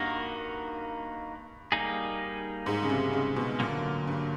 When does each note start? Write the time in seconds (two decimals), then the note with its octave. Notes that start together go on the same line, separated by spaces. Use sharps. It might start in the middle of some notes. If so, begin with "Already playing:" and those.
Already playing: G2 A#3 D#4 F#4 A#4
1.72 G3 A#3 D#4 G#4
2.66 G#2
2.83 C#3
2.89 C3
3.13 C#3
3.36 B2
3.60 A#2 D3 F#3 A#3
4.07 G2